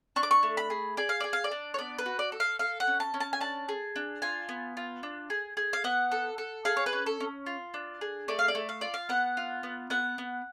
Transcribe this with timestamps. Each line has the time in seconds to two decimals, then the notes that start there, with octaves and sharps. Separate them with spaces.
0.16 D4 C#6
0.23 D6
0.31 C#6
0.43 A3
0.57 B5
0.70 G#4
0.97 G#4 D5
1.09 F5
1.20 G#4 D5
1.33 F5
1.44 D5
1.52 D4
1.74 C#5
1.78 B3 D5
1.98 B4
2.06 F#4
2.19 D5
2.32 A4
2.40 F5
2.59 A4 F5
2.80 F#5
2.87 C#4
3.00 A5
3.14 C#4
3.20 A5
3.33 G#5
3.41 D4 A5
3.69 G#4
3.96 D4
4.22 F4 G#5
4.49 B3
4.77 F4
5.03 D4
5.30 G#4
5.57 G#4
5.73 F5
5.84 B3 F#5
6.12 A4
6.38 A4
6.65 G#4 F5
6.77 C#5
6.86 B4
6.93 C#4
7.06 A4
7.20 C#4
7.46 F4
7.74 D4
8.01 G#4
8.28 A3 D5
8.39 F5
8.48 D5
8.55 A3
8.69 F5
8.81 F4 D5
8.94 F5
9.09 B3 F#5
9.37 F4
9.63 B3
9.90 B3 F#5
10.18 B3